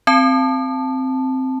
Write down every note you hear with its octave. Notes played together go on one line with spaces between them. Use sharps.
C4 A5